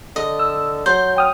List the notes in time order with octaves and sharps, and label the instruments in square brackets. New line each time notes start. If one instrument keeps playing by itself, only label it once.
[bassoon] D3 [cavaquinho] D#5
[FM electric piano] E6
[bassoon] F#3 [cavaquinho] C5 [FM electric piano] G6
[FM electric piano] G5 D#6 F6